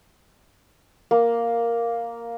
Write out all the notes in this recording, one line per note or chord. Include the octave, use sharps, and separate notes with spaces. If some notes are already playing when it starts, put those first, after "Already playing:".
A#3